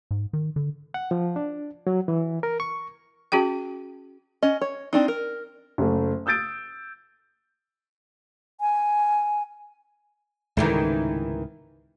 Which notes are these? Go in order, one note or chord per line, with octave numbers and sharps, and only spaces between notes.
G#2
D#3
D3
F#5
F3
D4
F#3
E3
A#4
C#6
C#4 F#4 G#4 G5
C#4 D#5
C#5
C4 D4 D#4
A#4
F#1 A3
D#6 E6 G6 A6 D7
G#5
C#2 G#2 C3 D#3 E3 A3